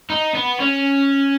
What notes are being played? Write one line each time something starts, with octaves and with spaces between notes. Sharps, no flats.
D#4
B3
C#4